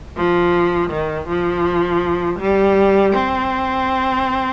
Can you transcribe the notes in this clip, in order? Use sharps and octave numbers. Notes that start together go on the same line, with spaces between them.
F3
D#3
F3
G3
C4